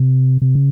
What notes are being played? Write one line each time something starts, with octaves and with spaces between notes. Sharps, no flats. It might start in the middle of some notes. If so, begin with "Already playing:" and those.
Already playing: C3
C3
C#3